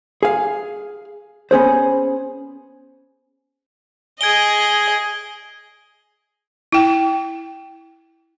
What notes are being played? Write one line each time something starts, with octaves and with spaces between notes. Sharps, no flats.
G#4 F5
B3 C#4 G#4 C5
G#4 D#5 G#6 D7 G7
E4 G5